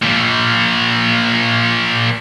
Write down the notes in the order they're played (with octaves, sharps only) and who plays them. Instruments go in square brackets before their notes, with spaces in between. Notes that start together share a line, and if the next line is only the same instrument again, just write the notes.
[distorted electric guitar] A#2 F3